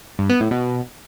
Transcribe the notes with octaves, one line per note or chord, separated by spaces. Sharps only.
G2
B3
A2
B2